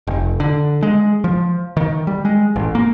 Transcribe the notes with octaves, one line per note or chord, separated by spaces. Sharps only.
F1
D3
G#3
F3
D#3
G3
G#3
A1
A#3